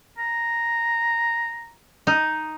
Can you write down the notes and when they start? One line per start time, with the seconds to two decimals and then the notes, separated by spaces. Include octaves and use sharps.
0.18 A#5
2.07 D#4